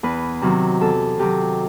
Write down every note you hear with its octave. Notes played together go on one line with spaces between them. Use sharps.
E2 B4
C3 D#3 F#3
E2 A4
C3 D#3 F#3 G4